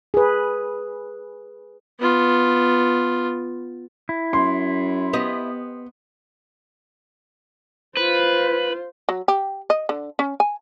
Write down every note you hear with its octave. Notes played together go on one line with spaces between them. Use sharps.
G#4 B4
B3 F4
E4
F#2 C6
B3 G4 D#5
F4 B4 C5
F#3
G4
D#5
D3
C#4
G#5